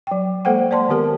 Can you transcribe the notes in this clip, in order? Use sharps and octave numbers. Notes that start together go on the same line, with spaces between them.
F#3 G5
G#3 A#3 A4 C5 F#5 G5
C5 D5 A5 C6
D#3 B3 G4 A#4 A5